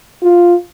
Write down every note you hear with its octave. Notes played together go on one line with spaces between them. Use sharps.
F4